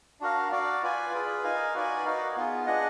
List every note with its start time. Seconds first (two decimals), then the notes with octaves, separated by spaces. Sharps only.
0.21 D4 F#4 A#4 F5
0.52 F#4 D5 F5
0.82 F4 B4 D5 G#5
1.13 F4 G#4 B4
1.43 D#4 A#4 F5 G#5
1.74 F#4 B4 D5 G#5
2.05 D#4 F#4 A#4 F5
2.36 B3 F4 G#4
2.66 D4 G#4 D#5 F#5